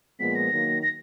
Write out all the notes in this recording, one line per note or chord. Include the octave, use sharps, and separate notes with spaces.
A#2 F3 G#3 B3 B6
A#6
D#3 F#3 A#3
A#6